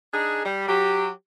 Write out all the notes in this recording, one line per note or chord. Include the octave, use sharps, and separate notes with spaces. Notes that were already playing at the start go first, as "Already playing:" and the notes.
D4 D#4 G#4
G3
F#3 G4